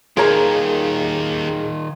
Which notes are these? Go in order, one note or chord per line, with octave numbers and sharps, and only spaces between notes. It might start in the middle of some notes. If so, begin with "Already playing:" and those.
D#2 D#3 F4 G#4 A#4 C#5 A#5